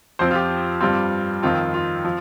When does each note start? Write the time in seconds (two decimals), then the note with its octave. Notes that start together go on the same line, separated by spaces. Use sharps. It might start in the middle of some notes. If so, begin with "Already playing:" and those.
0.19 F2 F3 C4 C5
0.31 F4
0.35 G4
0.81 G2 G3 C4 F4
1.43 F2 D#3 C4 F4
1.74 F4
2.05 F3